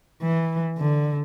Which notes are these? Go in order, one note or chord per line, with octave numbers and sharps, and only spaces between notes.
E3
D3